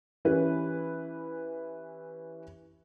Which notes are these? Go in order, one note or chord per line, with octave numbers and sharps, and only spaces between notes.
E3 C#4 E4 G4 B4